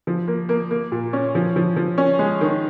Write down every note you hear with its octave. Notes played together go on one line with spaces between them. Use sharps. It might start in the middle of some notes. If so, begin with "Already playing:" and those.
F3
A#3
A#3
A#3
A#2
C#4
F3
F3
F3
C#4
G#3
D#3